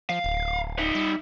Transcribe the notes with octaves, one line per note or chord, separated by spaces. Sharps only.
F3 F5
D1
D#4 E5
G3